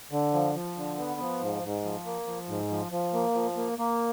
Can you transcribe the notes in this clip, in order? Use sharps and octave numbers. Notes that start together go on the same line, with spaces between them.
D3
F3
F3
D3
B3
F3
G#2
G#2
F3
A#3
F3
G#2
F3
F3
A#3
F3
A#3
A#3